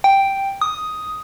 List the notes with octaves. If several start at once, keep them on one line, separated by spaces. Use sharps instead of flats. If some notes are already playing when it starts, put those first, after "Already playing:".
G5
D#6